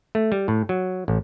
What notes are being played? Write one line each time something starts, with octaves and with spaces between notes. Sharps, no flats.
A3
G3
A2
F#3
A1